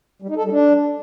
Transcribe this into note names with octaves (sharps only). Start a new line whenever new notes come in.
G3
D#4
A4
G3
D4